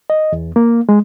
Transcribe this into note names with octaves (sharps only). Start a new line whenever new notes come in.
D#5
E2
A#3
G#3